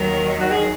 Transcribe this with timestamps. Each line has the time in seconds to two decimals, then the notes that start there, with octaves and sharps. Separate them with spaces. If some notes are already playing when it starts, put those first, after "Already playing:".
Already playing: D#2 D#3 F#3 A#4
0.40 F#4
0.51 G#4